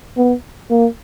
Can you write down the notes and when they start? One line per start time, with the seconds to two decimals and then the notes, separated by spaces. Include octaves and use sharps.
0.17 B3
0.70 A#3